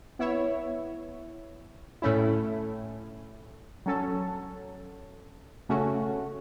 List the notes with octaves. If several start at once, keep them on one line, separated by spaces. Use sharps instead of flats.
B3 E4 C#5 E5
A2 A3 C#4 E4
F#3 C#4 A4
C#3 A3 C#4 F#4